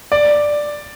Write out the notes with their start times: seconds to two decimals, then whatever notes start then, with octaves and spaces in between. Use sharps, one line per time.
0.12 D5